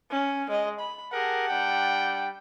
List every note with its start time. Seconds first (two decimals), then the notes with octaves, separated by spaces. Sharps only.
0.11 C#4
0.50 G#3 D#5
0.80 B5
1.12 G4 G#4 A#4 F#5 A5
1.49 G3 D4 G5